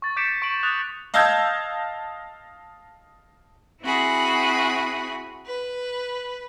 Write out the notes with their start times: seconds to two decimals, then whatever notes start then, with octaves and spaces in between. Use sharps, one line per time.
0.02 C#6 A6
0.16 D6 G6 B6 C#7 D7 E7
0.42 C#6 D7 F#7
0.63 D#6 F#6 A6 F7
1.14 D#5 F5 A5 E6 G6 G#6
3.83 C4 E4 F#4 G#4 B5
5.45 B4